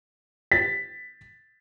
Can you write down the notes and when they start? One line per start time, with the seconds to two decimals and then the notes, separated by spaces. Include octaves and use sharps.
0.52 A6 B6